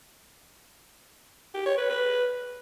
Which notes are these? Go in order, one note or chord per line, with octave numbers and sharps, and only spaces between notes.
G4
C#5
B4
B4